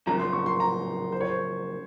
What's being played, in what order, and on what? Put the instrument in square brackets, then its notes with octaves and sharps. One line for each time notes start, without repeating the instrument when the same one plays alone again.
[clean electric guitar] F#2 C#3 F3 [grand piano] A#5
[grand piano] C6
C#6
C6
A#5
C5
C#5
C5